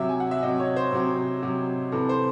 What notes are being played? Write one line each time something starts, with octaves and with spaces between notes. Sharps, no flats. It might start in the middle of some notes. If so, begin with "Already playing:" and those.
Already playing: C3 F#3 E5
G#5
F#5
E5
C3 F#3 D#5
C#5
C5
C3 F#3
C3 F#3
C3 E3 A4
C5